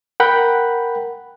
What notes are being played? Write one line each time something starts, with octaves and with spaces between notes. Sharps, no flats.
A#4 F#5 G5 B5 F#6